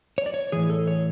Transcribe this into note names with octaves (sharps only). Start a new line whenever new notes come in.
C#5
D5
C#5
A2 E3 G#4
A4
C#5